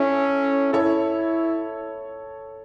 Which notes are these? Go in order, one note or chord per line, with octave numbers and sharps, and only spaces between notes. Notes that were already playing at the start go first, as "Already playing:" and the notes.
Already playing: C#4 E4 A4
E4 A4 C#5